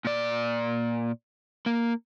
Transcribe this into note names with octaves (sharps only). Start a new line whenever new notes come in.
A#2 D5
A#3